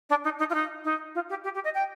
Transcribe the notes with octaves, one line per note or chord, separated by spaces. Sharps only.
D4
D#4
D#4
F4
D#4
D#4
F4
G4
G4
G4
D#5
G5